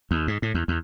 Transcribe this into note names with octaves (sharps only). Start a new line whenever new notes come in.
D#2
G#2
A2
E2
E2